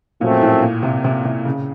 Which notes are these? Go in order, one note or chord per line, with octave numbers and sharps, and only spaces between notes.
F#2 A#2 F3 A3 C4
A2
A#2
C3
C3
C3
C#3